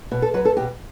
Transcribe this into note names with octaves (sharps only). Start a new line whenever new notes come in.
B2
A4
F#3 B4
A4
B2 G4